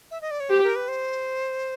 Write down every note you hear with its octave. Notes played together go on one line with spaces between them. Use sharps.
E5
D#5
D5
C#5
G4 C5
A#4
B4
C5